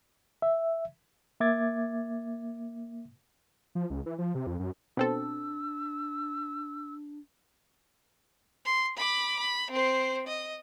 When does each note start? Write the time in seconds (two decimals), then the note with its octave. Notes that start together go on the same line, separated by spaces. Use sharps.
0.42 E5
1.40 A#3 E5 D6 G#6 A6
3.75 F3
3.90 C#2
4.06 E3
4.18 F3
4.35 C3
4.47 F2
4.60 F#2
4.97 B2 C4 D4 A4 E6
8.65 C6
8.97 B5 D6
9.39 B5
9.71 C4 C5
10.27 D#5